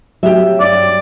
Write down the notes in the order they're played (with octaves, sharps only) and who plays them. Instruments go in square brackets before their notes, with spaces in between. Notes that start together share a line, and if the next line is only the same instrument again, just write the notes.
[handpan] F#3 [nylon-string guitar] G4 E5
[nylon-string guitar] G2 [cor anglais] D5